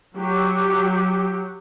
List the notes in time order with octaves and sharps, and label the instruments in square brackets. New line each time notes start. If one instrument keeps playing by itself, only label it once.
[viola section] F#3 G4